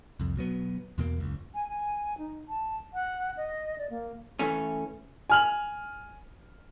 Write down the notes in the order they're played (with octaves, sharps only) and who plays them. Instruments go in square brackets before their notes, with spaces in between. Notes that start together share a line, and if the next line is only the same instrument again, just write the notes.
[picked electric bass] C2 F2
B2 F#3 B3
E2 B2 A#3
F#1 C#2
[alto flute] G#5
G#5
D#4
A5
F#5
D#5
D5
A#3
[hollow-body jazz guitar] E3 A3 C#4
[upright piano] G#5 F6 F#7